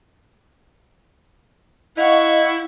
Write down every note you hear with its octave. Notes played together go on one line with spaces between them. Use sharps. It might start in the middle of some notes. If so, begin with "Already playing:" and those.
E4 D#5 F5 F#5 C#6